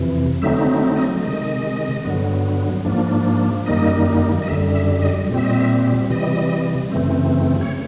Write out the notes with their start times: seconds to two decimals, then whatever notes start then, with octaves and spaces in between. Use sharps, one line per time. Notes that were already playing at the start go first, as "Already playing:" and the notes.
Already playing: F2 C3 E3
0.42 D3 F#3 A3 C4 D#4 E5
0.96 D#5
1.23 C3 D#3 G#3 D#5
2.04 G2 D3 F#3 B3
2.85 G#2 F3 A#3 D4
3.66 F#2 D#3 G3 A#3 D#4 D#5
4.42 D#5
4.48 F#2 D3 G3 E5
4.75 E5
5.02 D#5
5.29 A#2 G3 C4
5.37 E5
5.44 D#5
5.53 E5
6.10 C3 E3 G3 D#5
6.92 F#2 C#3 E3 A3 C4
7.61 C#5